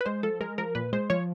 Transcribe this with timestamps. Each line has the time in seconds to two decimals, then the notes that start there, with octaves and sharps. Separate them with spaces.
0.01 B4
0.06 G#3 C5
0.23 F3 A4
0.41 G#3 A#4
0.58 F3 A#4
0.75 A#2 B4
0.93 G#3 C5
1.10 F3 C#5